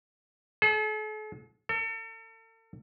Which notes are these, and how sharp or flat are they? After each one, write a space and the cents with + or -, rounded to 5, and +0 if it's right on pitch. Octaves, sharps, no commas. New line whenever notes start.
A4 -45
A4 +40